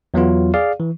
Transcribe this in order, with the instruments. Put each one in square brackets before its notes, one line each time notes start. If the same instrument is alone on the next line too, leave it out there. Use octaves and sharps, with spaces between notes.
[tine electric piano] E2 F#3 B3 F4
G#4 D5 F5
E3